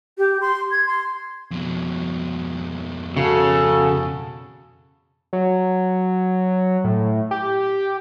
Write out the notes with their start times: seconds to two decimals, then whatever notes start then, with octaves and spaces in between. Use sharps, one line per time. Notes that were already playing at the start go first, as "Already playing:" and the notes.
0.18 G4
0.41 C6
0.71 G#6
0.86 C6
1.51 F2 B2
3.17 C#3 F#4 A4
5.33 F#3
6.84 A2
7.31 G4